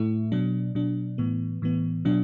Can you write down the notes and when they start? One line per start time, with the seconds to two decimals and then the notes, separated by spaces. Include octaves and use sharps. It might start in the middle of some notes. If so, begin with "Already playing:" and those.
Already playing: A2 A3 E4
0.32 B2 F#3 D4
0.75 B2 F#3 D4
1.18 A2 E3 B3
1.62 A2 E3 B3
2.05 B2 F#3 D4